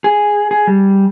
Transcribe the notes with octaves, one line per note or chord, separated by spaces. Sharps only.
G#4
G#4
G3